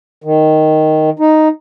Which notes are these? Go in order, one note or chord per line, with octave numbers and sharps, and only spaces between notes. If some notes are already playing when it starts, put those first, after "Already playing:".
D#3
D#4